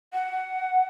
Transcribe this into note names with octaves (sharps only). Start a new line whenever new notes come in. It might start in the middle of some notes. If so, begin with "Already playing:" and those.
F#5